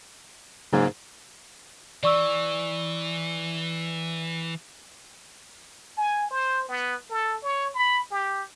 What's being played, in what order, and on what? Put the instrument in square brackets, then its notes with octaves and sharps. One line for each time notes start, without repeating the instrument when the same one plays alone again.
[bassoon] G#2 [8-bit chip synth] C#3 F#3 A#3
[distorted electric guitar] E3 [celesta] D5 C#6 E6
[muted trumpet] G#5
C5
B3
A4
C#5
B5
G4